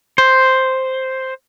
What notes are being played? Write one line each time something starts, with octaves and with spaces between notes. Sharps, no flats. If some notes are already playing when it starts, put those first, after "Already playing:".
C5